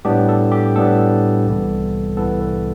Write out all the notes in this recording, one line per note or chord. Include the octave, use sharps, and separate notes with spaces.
A2 G3 B3 D4 G4
A4
G4
A2 G3 B3 D4 A4
C2 C3 E3 G3 B3
C2 C3 E3 G3 B3 A4
B4